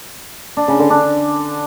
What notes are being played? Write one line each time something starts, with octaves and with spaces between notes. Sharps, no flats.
D4
C#3
D3
D4